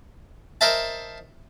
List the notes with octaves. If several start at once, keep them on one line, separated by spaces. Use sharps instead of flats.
A#4 C5 D#5 E5 A5